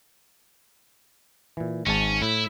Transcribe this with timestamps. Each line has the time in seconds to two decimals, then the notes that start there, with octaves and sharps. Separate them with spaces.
1.57 A#2 E3
1.87 G#1 G#2 C#4 A5
2.22 A2 E4